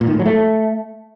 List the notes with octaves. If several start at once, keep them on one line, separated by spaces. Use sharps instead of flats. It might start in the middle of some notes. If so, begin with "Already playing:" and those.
A#2
D#3
A2
F#3
A3